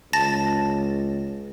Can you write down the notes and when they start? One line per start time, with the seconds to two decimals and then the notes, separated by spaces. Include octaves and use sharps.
0.13 C#2 A5 A6 A#6